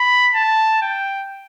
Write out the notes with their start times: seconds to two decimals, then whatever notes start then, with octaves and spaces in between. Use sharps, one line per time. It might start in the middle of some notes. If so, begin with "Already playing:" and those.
Already playing: B5
0.35 A5
0.82 G5